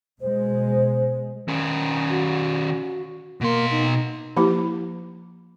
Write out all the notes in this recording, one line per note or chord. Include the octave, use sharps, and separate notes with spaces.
B2 G#3 C5
D#3 C#4
F#4
B2 A#3 C6
D#4
F3 A#3 E4 G4